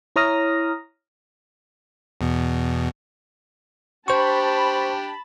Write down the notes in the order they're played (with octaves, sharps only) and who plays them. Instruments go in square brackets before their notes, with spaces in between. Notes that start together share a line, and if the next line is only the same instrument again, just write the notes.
[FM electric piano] E4 C#5 A#5 D#6 F6 A#6
[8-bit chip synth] E2 B2
[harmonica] D4 G4 [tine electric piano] C5 C#6 [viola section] A5 B5